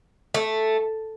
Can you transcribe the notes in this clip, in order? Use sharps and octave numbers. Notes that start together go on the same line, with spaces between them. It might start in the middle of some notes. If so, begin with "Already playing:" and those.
A3